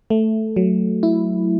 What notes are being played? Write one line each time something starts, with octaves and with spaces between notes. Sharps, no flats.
A3
F#3
E4